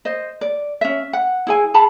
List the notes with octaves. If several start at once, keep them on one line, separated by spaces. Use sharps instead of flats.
C5 D#5
D5
C#4 E5
F#5
E4 G#4 G#5
G#4 A5 B5